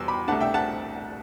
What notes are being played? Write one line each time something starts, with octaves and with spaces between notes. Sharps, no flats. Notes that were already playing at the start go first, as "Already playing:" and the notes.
Already playing: E2 B2 G3 C6 E6
B5 D6
C2 B2 A3 D4 F#5 A5
E5 G5
F#5 A5